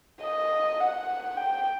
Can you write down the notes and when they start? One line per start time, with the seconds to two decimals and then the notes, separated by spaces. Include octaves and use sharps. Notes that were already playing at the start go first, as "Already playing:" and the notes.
0.22 D#5
0.80 F#5
1.37 G5